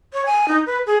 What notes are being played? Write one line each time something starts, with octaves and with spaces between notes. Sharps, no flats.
C#5
G#5
D#4
B4
G#4